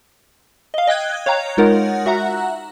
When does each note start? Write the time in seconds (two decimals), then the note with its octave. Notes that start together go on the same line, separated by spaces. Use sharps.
0.74 D#5 F5
0.87 D#5 G5 F#6 G#6
1.26 C#5 F5 G5 A#5
1.57 G#3 D#4 F4 A#4 C#5 F#5
2.06 F#4 E5 F#5 A#5